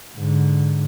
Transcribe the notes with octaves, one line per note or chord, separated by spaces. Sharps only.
G#2 D3